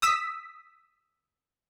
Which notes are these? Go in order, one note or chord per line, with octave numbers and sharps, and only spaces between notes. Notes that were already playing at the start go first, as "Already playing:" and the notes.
D#6 E6 B6